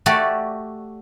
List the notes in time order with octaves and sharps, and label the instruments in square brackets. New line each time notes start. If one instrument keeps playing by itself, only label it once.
[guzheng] A3 F#4 G4 A4 D5